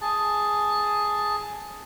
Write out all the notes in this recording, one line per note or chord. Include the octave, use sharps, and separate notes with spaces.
G#4 A5